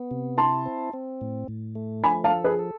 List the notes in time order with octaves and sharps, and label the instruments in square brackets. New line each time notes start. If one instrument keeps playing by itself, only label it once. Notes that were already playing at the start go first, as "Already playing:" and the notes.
Already playing: [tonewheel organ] B3
C3
[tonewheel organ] E4 [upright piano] A5 C6
[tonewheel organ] C4
C4
A2
A2
A3
[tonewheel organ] F3 [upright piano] G#5 B5
[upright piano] F5 A5
[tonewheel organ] A4
[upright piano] G#4 B4
[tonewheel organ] A4